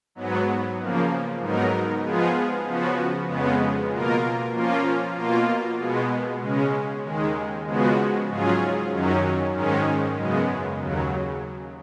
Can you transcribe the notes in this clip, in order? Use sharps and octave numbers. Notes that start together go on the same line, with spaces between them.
G#2 F#3 B3
C#3 F3 A#3
G#2 F#3 B3 D#4 A#4
F3 G#3 B3 F4 G#4
C#3 F3 B3 F#4
F2 C#3 G#3 B3
B2 A#3 F4 A#4
F3 A#3 C#4 F4
B2 A#3 F4
B2 G#3 B3
C#3 G#3 C#4
D#2 D#3 G#3
C#3 F3 G#3 B3 F#4
G#2 F#3 C#4 F4 G#4
F#2 D#3 F#3 C#4
G#2 D#3 G#3 C#4
F#2 C#3 G#3 B3
D#2 C#3 F#3